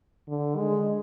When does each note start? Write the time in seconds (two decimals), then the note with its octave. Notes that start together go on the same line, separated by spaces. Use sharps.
0.28 D3
0.57 G#3